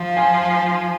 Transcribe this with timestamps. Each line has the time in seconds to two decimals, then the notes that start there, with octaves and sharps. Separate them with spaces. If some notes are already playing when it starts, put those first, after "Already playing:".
Already playing: F3 F5
0.17 G#5